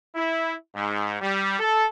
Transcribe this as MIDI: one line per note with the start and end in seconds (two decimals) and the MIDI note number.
0.15 0.52 64
0.75 1.20 44
1.21 1.58 55
1.59 1.86 69